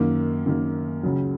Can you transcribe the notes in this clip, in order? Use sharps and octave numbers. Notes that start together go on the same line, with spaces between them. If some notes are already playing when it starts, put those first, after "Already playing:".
Already playing: F#2 D#3 A#3
F#2 D#3 A#3
C#2 C#3 F#3